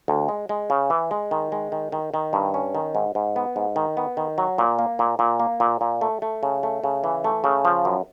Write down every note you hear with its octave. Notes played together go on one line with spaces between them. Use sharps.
D2
G#3
G#3
C#3
E3
G#3
D#3
G#3
D#3
D#3
D#3
G2
C#4
D#3
G#2
G#2
B3
G#2
D#3
B3
D#3
F#3
A#2
A#3
A#2
A#2
A#3
A#2
A#2
A3
A3
C#3
A3
C#3
E3
A3
C#3
F3
F#2